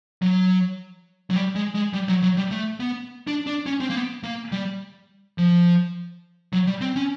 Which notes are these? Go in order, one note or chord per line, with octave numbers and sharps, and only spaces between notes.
F#3
F#3
G3
G#3
G#3
G3
F#3
F#3
G3
A3
B3
D4
D4
C#4
C4
A#3
B3
A#3
G3
F3
F#3
G3
C4
C#4